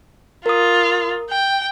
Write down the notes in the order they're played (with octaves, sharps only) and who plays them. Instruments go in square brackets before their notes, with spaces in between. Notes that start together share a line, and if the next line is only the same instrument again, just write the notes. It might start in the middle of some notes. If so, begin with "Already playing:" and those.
[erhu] F4 [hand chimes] A#4 D#6
[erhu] G5